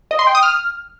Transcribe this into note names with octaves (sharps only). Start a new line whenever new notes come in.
D#5
C6
G5
D#6
F6